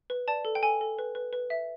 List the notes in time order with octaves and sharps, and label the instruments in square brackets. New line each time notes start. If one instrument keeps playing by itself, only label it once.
[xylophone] B4
D5 A5
A4
G5
A4 G#5
A4
B4
B4
B4
E5